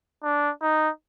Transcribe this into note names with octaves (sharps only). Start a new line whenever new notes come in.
D4
D#4